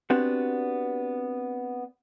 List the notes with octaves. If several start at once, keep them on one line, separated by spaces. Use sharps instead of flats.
B3 C4 D4 F#4 G4